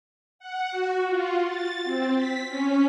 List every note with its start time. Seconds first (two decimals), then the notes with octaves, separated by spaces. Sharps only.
0.39 F#5
0.71 F#4
1.07 F4
1.46 A6
1.84 C4
2.16 B6
2.49 C#4